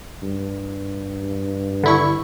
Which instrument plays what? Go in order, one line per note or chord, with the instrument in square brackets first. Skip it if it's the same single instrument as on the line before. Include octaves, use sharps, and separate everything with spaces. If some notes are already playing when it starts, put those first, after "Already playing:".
[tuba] G2
[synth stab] D3 E4 C#6